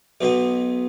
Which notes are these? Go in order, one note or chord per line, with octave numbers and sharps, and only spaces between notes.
B1 B2 B3